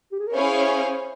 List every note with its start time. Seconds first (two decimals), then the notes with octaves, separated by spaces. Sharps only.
0.12 G4
0.19 G#4
0.27 A#4
0.34 C#4 E4 G#4 C5 C#5 F5